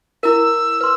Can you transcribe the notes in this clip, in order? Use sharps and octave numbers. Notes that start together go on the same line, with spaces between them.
E4 A#4 E6
B4 C6